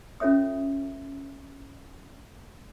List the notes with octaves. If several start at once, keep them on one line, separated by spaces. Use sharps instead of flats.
C#4 F4 A4 C#5 E5 D#6